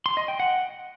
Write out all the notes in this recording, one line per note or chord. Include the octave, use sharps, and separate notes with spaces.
C6
D#5
G5
F#5